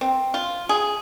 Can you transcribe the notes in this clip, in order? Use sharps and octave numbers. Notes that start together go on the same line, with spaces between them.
C4
F4
G#4